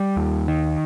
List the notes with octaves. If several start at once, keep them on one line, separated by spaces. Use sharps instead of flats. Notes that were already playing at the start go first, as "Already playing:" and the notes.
Already playing: G3
D#2
D#3